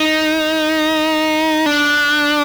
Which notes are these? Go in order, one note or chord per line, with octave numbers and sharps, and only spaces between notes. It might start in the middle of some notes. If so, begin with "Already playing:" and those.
Already playing: D#4
D4